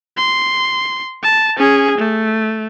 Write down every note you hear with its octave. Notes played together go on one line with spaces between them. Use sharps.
C6
A5
C#4 G#4
A3